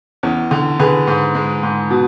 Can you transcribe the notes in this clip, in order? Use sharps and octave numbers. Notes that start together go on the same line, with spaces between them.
E2 C#4
D3
D3 G#4 B4
G#2
G#3
G#2
B2